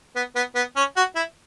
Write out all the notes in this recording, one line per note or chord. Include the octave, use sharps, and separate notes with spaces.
B3
B3
B3
C#4
F#4
E4